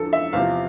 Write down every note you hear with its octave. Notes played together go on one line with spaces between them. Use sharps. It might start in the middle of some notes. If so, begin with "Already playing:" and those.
Already playing: E2 D3 F3 A4
E5
E2 C3 F3 F5